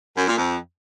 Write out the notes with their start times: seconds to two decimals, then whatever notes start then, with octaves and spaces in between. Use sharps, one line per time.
0.16 F#2
0.27 A#2
0.38 F2